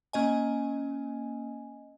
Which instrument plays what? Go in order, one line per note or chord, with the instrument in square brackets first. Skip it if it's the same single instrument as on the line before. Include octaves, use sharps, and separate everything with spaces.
[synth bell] A#3 C#4 D#5 G#5